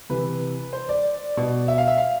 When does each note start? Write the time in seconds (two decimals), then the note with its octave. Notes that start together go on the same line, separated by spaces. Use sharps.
0.10 C3 E3 B4
0.73 C5
0.89 D5
1.37 B2
1.68 E5
1.78 F5
1.88 E5
1.97 F5